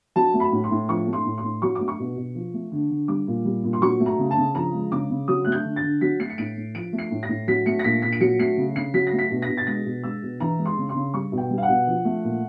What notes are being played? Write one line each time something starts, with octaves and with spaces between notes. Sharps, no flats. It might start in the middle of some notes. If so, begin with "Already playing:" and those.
F#3 A5
A3
B5
A2
C6
A2
F3 C#6
A3
C6
A2
C6
A2
F#3 C#6
D6
A3
C#6
B2
B2
F3
A3
D3
D3
G3 D6
A#2
G3
A#2
C6
F#3 C#6
A3
A#5
C#3
A5
C#3
F3 A#5
G#3
C#3 D6
C#3
F#3 D#6
A3 F#6
G6
D3
A6
D3
F#3 B6
A3 C7
C#7
A2 D7
A2
F3 D7
A3
C7
A2
A#6
A2
F#3 B6
A3 C#7
A#6
A#2 B6
A#2 B6
D7
F#3 C#7
A3 C7
C#3
C#3 C7
F#3 B6
A#6
A3
B6
B2
A#6
B2
A6
G#3 A#6
B2
G#3 E6
B2
E3 A#5
G#3
C6
C#3
C6
C#3
G3 C#6
B2
G5
G3
F5
F#5
B2
F3
A3
A#2